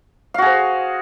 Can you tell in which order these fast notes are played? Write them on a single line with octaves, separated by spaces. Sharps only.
F5 F#4 G#4 C5